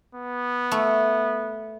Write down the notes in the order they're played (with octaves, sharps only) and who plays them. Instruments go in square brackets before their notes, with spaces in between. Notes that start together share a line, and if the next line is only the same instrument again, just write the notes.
[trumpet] B3
[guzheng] A3